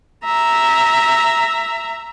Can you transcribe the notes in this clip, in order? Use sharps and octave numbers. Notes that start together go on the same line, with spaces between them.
E5 A#5